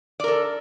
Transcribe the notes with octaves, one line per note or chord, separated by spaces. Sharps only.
A4 A#4 D5